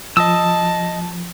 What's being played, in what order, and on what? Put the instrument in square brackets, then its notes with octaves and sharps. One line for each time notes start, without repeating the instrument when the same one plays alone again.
[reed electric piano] F3 [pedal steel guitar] D#5 D#6 E6 [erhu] A5